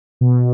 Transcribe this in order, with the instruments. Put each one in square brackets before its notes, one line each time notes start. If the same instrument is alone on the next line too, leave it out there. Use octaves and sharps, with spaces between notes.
[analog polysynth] B2